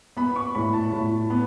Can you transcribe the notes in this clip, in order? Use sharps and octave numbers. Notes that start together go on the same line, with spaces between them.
B3 B5
C#6
A2 B5
A5
A2
B3